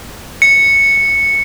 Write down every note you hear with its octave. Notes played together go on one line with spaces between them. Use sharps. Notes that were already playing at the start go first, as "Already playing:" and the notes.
C#7